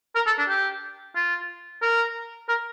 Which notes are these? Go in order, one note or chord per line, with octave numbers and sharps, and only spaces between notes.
A#4
A4
D4
G4
F4
A#4
A#4